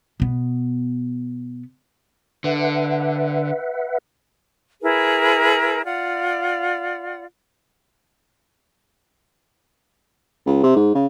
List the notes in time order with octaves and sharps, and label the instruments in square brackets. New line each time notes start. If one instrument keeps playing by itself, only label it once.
[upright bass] B2 B3
[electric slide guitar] D3 [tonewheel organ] B4 E5 F#5
[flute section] E4 G#4 A#4 B4
F4 D5 F#5
[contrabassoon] C#2
C3
G#2
C#3